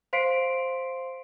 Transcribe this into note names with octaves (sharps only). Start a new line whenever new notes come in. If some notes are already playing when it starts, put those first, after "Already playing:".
C5 F5 C6 B6 C7 D7